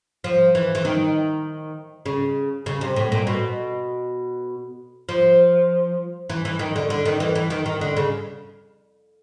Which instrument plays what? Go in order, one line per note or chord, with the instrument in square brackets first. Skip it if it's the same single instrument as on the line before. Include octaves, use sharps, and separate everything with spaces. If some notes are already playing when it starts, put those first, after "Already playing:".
[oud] F3
E3
E3
D#3
C#3
C#3
C3
A2
A#2
B2
F3
E3
E3
D#3
D3
D3
D#3
E3
E3
D#3
D#3
D3
C#3